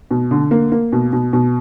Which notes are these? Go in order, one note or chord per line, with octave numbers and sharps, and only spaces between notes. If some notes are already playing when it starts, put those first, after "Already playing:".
B2
D3
A#3
A#3
B2
B2
B2